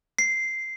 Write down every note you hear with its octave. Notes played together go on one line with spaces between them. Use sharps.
C7